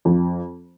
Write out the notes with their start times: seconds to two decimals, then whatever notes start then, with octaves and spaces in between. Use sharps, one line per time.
0.05 F2